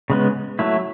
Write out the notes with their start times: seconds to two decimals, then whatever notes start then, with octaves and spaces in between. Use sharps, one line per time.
0.10 C#3 G#3 B3
0.59 F#3 A3 E4